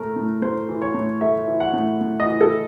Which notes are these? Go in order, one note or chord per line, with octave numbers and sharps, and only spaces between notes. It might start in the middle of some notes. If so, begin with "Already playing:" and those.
Already playing: A2 A3 A#4
A2
A2 C5
E3
C#5
A2
A3 E5
E3
F#5
A2
A2
D#5
E3
A4